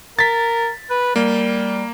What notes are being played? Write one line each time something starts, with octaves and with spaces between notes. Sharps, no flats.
A#4 A6 B6
B4
G3 A#3